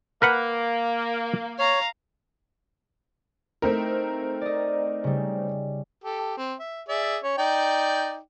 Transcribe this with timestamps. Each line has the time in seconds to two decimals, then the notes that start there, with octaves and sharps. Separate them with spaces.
0.22 A#3 A#4 B4 F#5
1.59 C#5 F5 A#5
3.62 A3 C4 D#4 A#4 E5
4.41 D5 D#5
5.04 C#3 G3
6.04 G4 A4
6.37 C4
6.59 E5
6.88 G#4 D5 E5
7.23 C#4 C#5
7.38 D#4 D5 G5